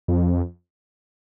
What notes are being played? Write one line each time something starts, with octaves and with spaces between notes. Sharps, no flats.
F2